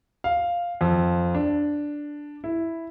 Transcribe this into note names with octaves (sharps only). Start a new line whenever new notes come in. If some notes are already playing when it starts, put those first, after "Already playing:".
F5
F2
D4
E4